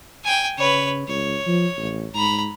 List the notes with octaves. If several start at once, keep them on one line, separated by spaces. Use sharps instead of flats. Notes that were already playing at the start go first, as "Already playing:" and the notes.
G5 G#5
C#3 B4 C#5
C#2 C#5
F3
A1
G#2 A#5 B5